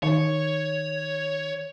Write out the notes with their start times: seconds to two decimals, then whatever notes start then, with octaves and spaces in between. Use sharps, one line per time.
0.03 D#3 C#5